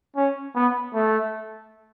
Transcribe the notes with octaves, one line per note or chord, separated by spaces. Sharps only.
C#4
B3
A3